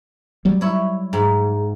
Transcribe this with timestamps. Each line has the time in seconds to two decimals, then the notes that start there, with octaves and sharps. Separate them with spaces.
0.45 F#3 G3
0.61 E4 C#5
1.13 G#2